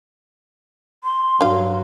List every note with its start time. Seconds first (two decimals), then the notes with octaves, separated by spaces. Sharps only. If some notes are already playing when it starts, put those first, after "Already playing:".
1.04 C6
1.41 G2 F#3 D4 F5